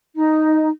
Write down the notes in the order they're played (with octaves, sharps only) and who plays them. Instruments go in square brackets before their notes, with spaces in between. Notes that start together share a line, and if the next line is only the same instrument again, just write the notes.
[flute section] D#4